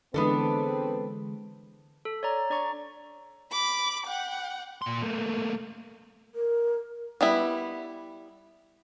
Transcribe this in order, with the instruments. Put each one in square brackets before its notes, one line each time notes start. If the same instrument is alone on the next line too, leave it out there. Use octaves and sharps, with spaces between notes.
[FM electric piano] D3 E3 G#3 [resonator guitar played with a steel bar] B3 D4 A4 [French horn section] C4 B4
[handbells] A4
C#5 D5 A#5
D4 D5 A#5 C#6
[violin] B5 D6
F#5 G5
[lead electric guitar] A#2 C6
A3 A#3
[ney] A#4
[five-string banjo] G3 B3 E4